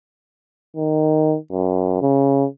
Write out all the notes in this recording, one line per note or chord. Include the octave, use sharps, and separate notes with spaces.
D#3
F#2
C#3